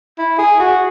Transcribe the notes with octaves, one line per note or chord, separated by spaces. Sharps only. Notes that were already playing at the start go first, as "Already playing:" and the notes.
E4
G#4
F#4